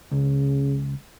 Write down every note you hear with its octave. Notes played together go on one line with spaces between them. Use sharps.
C#2 C#3